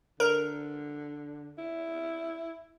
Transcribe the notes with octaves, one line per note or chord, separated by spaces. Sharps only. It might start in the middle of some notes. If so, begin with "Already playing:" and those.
D3 A#4
E4